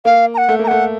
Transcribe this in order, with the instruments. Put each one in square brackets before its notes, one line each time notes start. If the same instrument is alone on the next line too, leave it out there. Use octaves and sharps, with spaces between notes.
[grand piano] A#3 [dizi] F5
[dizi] A#5
F#5
[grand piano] A3
[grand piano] A#3 [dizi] A#5
[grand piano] A3 [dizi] F#5